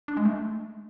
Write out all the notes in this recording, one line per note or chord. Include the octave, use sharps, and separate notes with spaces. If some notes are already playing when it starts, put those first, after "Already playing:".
D4
G#3
A3